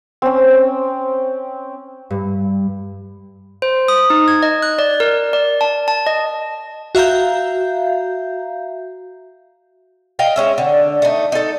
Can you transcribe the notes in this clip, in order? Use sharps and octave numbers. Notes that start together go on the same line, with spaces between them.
C4 C#4
G2
C5
D#6
D#4
G#6
D#5
F#6
D5
A#4
D5
A5
A5
D#5
F#4 E5 F5 A#5 G6
D#5 F5 G5
G#3 C#4 E5
D3
A3 D#4
D#4 A4